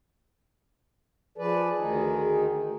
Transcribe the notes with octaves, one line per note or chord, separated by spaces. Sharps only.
F3 G#4 B4 D5
D2 D#3 D#4